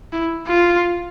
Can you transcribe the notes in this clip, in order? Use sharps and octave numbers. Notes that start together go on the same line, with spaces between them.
E4
F4